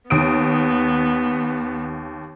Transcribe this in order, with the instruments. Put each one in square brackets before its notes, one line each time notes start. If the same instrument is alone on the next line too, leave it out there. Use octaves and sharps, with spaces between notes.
[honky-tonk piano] D#2 D#6 D7 [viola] B3